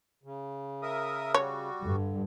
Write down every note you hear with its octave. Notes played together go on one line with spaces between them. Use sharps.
C#3
A#4 E5 D#6
G3 F#4 C#5
G2 D3